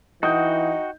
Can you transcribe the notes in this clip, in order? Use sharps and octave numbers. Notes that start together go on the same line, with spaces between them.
E3 D#4 F#4 F#5 G5 D#6 G6